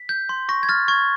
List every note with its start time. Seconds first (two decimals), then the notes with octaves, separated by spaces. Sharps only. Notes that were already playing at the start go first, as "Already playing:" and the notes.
Already playing: B6
0.09 G6
0.29 C6
0.49 C#6 A#6
0.63 G#6
0.69 F6 A6
0.88 C#6 G#6